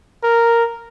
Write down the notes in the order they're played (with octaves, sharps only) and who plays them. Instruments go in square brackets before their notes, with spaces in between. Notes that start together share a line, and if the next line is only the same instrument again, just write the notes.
[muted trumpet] A#4